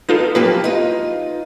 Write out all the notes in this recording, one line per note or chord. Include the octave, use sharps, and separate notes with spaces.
B3 D#4 F4 A4
F3 F#3 A#3 G4 B4
D#4 F4